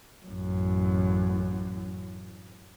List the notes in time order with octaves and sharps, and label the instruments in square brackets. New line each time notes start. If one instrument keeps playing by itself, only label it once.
[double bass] A1 F#2